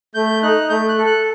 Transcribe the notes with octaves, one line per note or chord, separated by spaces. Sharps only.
A3 G6
D#4 F#6
A3 G6
F#6
A4
F#6